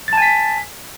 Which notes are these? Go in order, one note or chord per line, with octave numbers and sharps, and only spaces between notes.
G#5 A5 A6 B6